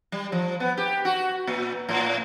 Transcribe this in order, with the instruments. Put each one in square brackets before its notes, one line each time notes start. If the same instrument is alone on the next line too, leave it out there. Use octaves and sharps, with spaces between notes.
[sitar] G3
F3
B3
G4
F#4
A#2
A2